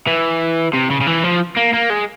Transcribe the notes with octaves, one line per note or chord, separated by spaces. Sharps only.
E3
C3
C#3
C#3
E3
F3
A#3
A#3
G#3